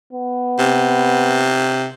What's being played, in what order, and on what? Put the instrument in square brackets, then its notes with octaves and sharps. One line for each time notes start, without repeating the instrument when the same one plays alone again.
[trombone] B3
[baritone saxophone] C3